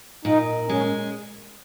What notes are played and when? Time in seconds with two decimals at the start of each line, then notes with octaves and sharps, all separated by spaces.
0.25 A#2 D#4
0.69 G#3 C#4